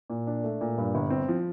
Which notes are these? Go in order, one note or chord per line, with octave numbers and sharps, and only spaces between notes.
A#2
D4
A3
A#2
G2
G1
C4
F3